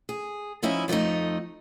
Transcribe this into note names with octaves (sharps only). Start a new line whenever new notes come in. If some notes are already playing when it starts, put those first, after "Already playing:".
G#4
F3 C#4 D#4 E4 E5
F2 F3 G3 A3 D#4